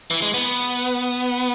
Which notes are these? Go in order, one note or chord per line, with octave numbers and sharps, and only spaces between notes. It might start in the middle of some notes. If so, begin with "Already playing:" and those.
E3
G#3
B3